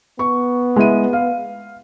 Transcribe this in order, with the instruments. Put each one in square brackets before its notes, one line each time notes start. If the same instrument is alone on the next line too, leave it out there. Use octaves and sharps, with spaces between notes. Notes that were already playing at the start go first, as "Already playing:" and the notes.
[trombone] B3 [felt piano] C#6
[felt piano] G#3 E4 D#7
F5